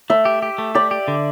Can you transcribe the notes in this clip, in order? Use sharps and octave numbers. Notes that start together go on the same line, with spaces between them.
A3 E5
G4
G4
A3
G4 D5
G4
D3